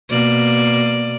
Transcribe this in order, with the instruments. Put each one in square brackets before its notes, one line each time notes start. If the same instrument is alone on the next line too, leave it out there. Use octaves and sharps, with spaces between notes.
[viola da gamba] B2 A#3 D5